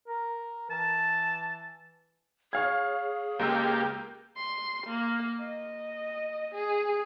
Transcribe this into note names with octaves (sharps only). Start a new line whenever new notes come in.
A#4
E3 A5
G#4 C#5 F5 G#6
C#2 G#3 A#3 G4 E6
C6
A#3
D#5
G#4